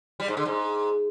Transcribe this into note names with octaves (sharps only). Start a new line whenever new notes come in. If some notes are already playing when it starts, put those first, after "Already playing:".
G3
G#2
D3
G#2